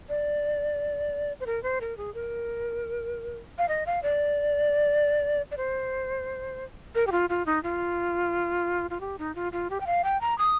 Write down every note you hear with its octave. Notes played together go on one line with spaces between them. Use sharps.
D5
C5
A#4
C5
A#4
G#4
A#4
F5
D#5
F5
D5
D5
C5
A#4
G4
F4
F4
D#4
F4
F4
G4
D#4
F4
F4
G4
G5
F5
G5
A#5
D#6